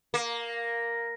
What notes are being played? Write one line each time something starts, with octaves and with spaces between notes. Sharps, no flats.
A#3